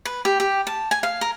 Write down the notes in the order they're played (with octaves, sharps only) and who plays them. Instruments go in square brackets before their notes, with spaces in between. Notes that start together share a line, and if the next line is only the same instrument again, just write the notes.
[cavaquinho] B4
G4
G4
A5
G#5
F5
A#4